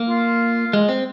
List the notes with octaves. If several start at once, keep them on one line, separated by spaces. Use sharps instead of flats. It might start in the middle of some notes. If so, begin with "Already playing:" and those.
Already playing: A#3
F4
G#3
C4